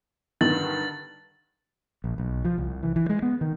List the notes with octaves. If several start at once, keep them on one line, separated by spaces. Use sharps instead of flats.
G2 D3 D#3 A6 F#7
A#1
B1
F3
C2
E3
E3
G#3
B3
D#3